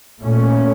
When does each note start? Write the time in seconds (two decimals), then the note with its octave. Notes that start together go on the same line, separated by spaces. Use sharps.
0.23 A#2 A3 C#4